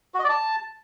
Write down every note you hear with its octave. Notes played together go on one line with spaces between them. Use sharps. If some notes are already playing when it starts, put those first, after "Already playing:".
F#4
D#5
D5
A5